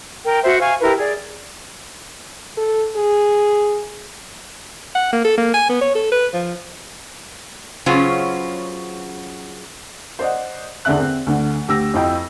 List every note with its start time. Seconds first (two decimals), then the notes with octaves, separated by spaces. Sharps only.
0.24 A#4 G5
0.44 F#4 C5 E5
0.59 F5 G#5 C#6
0.81 E4 G4 A#4 B4
0.97 G#4 D5
2.57 A4
2.96 G#4
4.95 F#5
5.12 A#3
5.24 A4
5.37 A#3
5.54 G#5
5.69 B3
5.81 C#5
5.95 A4
6.12 B4
6.33 F3
7.86 C#3 F#3 B3 C#4 F4 C5
10.19 C5 D5 D#5 F#5
10.85 E2 D3 D4 E5 F#6
10.99 C4
11.26 D2 D3 A3
11.68 D2 G4 E6 A#6
11.94 F2 E4 F4 D#5 G5